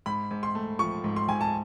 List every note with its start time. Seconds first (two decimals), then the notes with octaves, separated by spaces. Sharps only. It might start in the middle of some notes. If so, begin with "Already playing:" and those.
0.06 G#2 B5
0.31 G#2
0.43 C6
0.55 A3
0.79 F3 C#6
1.04 G#2
1.16 C6
1.28 G#2 G#5
1.41 A5